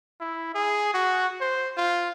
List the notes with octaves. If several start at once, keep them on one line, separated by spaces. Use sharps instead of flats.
E4
G#4
F#4
C5
F4